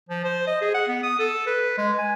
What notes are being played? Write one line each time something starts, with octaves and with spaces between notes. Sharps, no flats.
F3
C5
D#5
G#4
F#5
B3
D#6
A4
B4
G#3
G#5